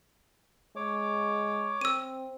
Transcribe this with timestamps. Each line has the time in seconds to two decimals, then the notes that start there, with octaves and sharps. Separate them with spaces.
0.76 G#3 C#5 D6
1.81 C4 E6 D#7